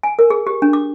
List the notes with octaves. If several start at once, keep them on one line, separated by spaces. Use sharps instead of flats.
G#5
A#4
G#4
G4
D4
D6